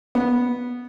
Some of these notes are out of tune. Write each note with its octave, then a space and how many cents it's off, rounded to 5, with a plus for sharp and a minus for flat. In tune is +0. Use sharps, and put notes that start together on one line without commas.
B3 -5